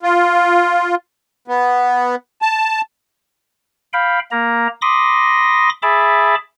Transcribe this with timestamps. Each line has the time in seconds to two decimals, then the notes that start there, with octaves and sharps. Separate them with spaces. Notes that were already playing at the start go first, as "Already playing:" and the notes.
0.03 F4
1.48 B3
2.42 A5
3.93 F5 G5 B5
4.31 A#3 A#5
4.82 B5 C6 D6 D#6 A#6
5.82 G#4 E5 A5 B5 D6